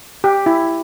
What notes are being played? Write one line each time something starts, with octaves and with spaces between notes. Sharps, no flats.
G4
E4